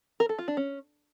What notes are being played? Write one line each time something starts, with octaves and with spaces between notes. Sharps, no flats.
A#4
A4
F4
D4
C#4